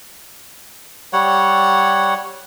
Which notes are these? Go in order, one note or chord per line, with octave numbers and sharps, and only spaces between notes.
G3 C#5 F#5